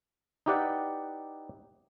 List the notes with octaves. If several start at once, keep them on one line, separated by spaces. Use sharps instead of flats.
D#4 E4 G4 B4 D5 F#5